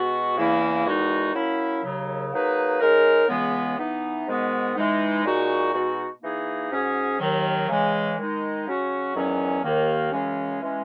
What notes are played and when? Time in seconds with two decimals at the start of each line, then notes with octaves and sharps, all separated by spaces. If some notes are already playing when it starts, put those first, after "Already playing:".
Already playing: B2 G#3 B3 F#4
0.38 E2 C#3 E3 A#3 E4
0.85 E2 D#3 G#3 D#4 F#4
1.34 F#3 A#3 C#4 E4
1.84 D#2 C#3 F#3
2.32 F#3 A#3 D#4 G#4 B4
2.80 C#3 G#3 D#4 A#4
3.29 C#2 C#3 E3 G#3 B3
3.79 E3 B3 D#4
4.27 G#2 D#3 G#3 B3 F#4
4.77 E3 G#3 D#4
5.25 A#2 G#3 D#4 F#4
5.74 B2 G#3 D#4 F#4
6.22 E3 A#3 D#4 G#4
6.70 G#2 F#3 C#4 G#4
7.20 D#2 D#3 F#3
7.69 C#3 E3 G#3
8.18 D#3 G#3 D#4
8.67 C#3 F#3 C#4 F#4
9.15 E2 D#3 F#3 C#4
9.63 D#2 D#3 A#3
10.12 F#2 C#3 E3 G#3 C#4
10.61 E3 G#3 C#4